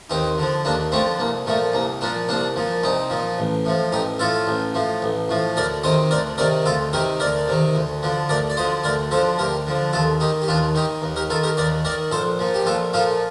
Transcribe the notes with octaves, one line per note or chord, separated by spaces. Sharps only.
D#2 C4 D#4
D3 F3
D#2 A#3 D4
D3 F3 A3 C4
C2 A#3
A#2 F3 A3
C2 A#3
A#2 F3 A#3 D4
C2 A#3 D4
A#2 F3
C2 C4 D#4
A#2 F3
A1
A2 F3
A1 D#4 G4
A2 F3 F4 A4
A1
A2 F3
A1
A2 F3
D2 A#4 D5
C3 D#3 C5 D#5
D2 A#4 D5
C3 D#3 A#4 D5
D2 F4 A4
C3 D#3 G4 A#4
D2 A#4 D5
C3 D#3
D2
D3 F3
D2 A#4 D5
D5
D3 F3 C5 D#5
D2 A#4 D5
D3 F3 A4 C5
D2 G4 A#4
D3 F3
D#2 F4 A4
D#3 D#4 G4
G4
D#2 D4 F4
D#3 D#4 G4
D#2
G4 A#4
D#3 F4 A4
G4 A#4
D#2 A#4 D5
D#3 A#4 D5
A#1 A4 C5
A#2 F3
G4
A#1 F4 A4
A#2 F3 F4 A4